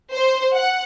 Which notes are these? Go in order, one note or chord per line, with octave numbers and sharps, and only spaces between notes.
C5
F#5